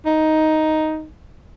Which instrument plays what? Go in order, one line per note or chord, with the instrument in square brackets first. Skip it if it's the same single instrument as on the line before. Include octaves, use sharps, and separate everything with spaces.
[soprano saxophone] D#4